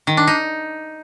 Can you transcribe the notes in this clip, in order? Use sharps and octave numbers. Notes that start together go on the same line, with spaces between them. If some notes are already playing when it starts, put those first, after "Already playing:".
D#3
D4
D#4